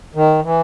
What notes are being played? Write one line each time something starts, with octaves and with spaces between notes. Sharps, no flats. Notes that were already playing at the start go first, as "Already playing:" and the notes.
D#3
E3